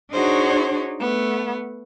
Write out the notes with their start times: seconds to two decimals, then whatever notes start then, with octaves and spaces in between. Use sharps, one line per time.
0.11 D4 D#4 F#4 G#4 C5 C#5
1.01 A3 B3